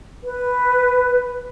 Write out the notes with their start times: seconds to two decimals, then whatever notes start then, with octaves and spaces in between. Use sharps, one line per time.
0.24 B4